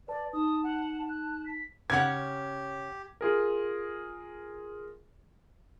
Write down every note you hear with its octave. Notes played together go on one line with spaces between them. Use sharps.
B4 D5 A5
D#4 A5 D#6
F#5
F#6
B6
C#3 C#4 G4 F#5 G#6
F4 G#4 A#4